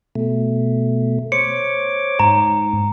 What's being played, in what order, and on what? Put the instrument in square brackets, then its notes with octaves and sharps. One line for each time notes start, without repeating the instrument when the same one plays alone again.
[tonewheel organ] B2 A3
[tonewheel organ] C5 C#5 D6 [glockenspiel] C#7
[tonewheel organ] G#2 [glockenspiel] A#5